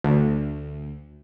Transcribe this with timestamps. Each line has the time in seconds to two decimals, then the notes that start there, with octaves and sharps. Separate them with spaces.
0.04 D2